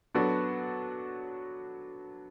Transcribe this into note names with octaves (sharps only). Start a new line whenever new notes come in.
F#3 B3 D4 F#4 A4